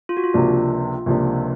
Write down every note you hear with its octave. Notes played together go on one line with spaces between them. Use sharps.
F4
F#4
F4
C#2 C3 F3 A#3 D4
C#2 C3 F3 A#3 D4